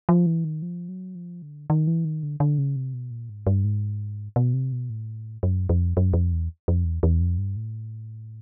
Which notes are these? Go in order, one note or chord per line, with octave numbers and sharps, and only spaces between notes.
F3
E3
D#3
F3
F#3
F3
D3
D#3
E3
D#3
D3
D3
C#3
C3
B2
A#2
G#2
G2
G#2
B2
C3
B2
A2
F#2
F2
F#2
F2
E2
F2
E2
E2
F2
G2
A2